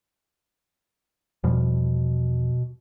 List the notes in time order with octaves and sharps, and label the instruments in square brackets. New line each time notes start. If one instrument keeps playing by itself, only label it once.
[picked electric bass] E2 F3 G3 [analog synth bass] B2